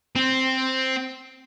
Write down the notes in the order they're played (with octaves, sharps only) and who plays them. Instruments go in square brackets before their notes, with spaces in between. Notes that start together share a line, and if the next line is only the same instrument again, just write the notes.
[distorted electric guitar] C4